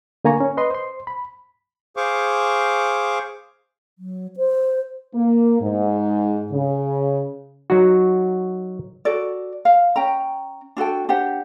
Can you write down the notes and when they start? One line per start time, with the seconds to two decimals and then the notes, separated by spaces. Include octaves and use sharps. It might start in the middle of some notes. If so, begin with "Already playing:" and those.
0.25 D3 A#3 G#5 A#5 C#6
0.40 C#4
0.57 B4 D#5 C6
0.70 C5 C6
1.07 B5
1.97 G#4 C5 F5 C#6 D6
3.99 F#3
4.37 C5
5.14 A#3
5.62 G#2
6.52 C#3
7.70 F#3 D#4 F#4
9.05 F#4 A4 D5
9.65 F5
9.96 C#4 G5 A#5
10.77 D4 F#4 A4 G5
11.09 D4 G4 C5 F#5